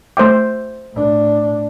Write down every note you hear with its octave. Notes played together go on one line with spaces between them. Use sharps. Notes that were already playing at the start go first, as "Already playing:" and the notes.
A3 C5 E5 G5 D6
A2 D4